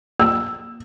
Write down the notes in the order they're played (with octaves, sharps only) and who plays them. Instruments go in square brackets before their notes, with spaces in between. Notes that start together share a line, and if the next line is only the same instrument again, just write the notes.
[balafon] A#3 [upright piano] E6